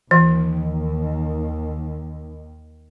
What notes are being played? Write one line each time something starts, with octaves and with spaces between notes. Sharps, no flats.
D#2 D#3 E3